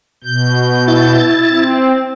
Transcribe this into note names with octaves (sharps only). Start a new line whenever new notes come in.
B2 G6
E4 A6
C4